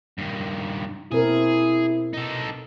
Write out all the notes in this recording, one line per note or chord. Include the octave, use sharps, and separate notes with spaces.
G2 D#3
B2 C4 E4 G#4 A#4
D#4 A4